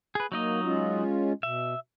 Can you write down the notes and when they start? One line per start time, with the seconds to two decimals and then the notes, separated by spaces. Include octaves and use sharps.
0.15 G#4 B4
0.32 F#3 A#3 D#4 D#5
0.65 G#3 C#4 F4
1.43 B2 E5